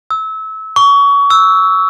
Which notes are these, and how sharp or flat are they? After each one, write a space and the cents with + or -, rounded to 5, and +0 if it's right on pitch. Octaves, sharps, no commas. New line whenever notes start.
E6 -25
C#6 +30
E6 -5